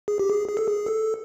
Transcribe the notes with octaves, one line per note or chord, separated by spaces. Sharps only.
G#4
G4
G#4
G#4
A4
G#4
A4